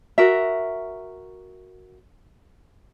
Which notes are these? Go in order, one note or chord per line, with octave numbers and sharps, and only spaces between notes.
F#4 A#4 E5